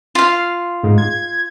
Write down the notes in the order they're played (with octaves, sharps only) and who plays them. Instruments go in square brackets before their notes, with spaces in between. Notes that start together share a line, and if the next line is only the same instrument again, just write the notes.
[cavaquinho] F4 F5
[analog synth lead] G#2
G#6